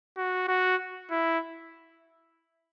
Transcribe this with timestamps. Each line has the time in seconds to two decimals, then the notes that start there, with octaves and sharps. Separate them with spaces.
0.17 F#4
0.48 F#4
1.11 E4